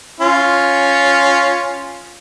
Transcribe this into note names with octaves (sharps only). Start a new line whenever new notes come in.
C#4 F4